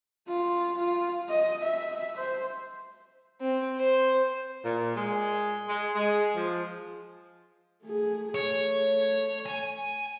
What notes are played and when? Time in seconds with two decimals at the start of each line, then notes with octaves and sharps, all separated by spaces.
0.28 F4
0.78 F4
1.29 D#5
1.62 E5
2.17 C5
3.41 C4
3.78 C5
4.64 A#2
4.96 G#3
5.69 G#3
5.95 G#3
6.35 F3
7.83 A3 G#4
8.34 A3 C#5
9.46 G#5